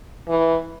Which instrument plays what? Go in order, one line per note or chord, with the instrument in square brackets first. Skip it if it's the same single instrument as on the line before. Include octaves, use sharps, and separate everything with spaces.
[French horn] E3